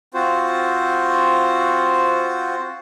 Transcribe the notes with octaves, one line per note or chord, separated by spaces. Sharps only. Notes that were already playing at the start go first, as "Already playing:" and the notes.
C4 F4 F#4 C5